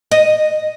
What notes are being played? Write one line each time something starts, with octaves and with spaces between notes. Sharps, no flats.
D#5